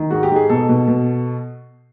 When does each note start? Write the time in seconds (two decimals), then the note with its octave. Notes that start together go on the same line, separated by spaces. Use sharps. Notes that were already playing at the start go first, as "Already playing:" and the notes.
Already playing: D#3
0.11 G#2 F#4
0.23 G4
0.31 G#2
0.36 G#4
0.49 B2 A4
0.69 B2
0.88 B2